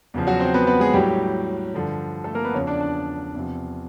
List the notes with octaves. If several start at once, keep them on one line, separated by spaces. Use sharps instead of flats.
E2 C#3 F3
F#3 F#4
C4 C5
B3 B4
B3 B4
G#3 G#4
A2 F#3 G3 G4
G2 D3 F3
A3 A4
A#3 A#4
B3 B4
E2 C#3 F3 C#4 C#5
D4 D5
D4 D5
E2 C3 F3